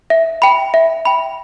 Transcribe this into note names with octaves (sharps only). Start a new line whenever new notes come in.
E5
G5 B5
E5
G5 B5